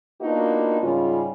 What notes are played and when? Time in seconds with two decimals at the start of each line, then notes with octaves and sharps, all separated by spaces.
0.21 A#3 B3 D4 D#4 F4 F#4
0.81 G#2 C#3 G3 C#4 F4